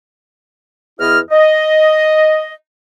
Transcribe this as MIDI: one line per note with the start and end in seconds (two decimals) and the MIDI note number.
0.99 1.19 40
0.99 1.19 64
0.99 1.19 75
0.99 1.19 89
1.31 2.52 75